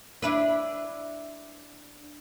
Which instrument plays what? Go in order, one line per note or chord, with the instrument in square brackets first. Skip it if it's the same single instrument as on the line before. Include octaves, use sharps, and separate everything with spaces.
[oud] D4 E4 B4